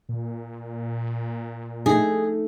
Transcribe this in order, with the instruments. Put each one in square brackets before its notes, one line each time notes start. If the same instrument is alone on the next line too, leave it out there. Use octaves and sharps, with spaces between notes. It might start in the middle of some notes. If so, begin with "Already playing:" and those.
[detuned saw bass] A#2
[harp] A3 D#4 [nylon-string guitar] G#4